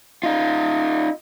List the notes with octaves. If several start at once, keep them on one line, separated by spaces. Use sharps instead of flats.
D#4 F4